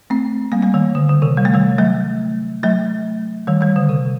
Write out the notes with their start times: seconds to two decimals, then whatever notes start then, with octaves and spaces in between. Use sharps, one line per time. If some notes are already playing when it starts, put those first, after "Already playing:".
0.10 A3 C4
0.52 G3 A#3
0.62 G3 A#3
0.74 D#3 G3
0.95 D3
1.09 D3
1.22 C3 D#3
1.37 G3
1.45 A3
1.54 D#3 G3
1.79 F#3 A3
2.63 F#3 A3
3.47 D#3 G3
3.61 D#3 G3
3.76 D3
3.89 C3